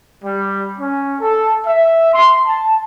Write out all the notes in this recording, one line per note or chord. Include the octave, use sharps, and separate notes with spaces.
G3
C#4
A4
E5
C6
A5